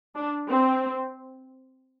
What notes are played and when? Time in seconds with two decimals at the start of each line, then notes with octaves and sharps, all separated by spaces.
0.15 D4
0.49 C4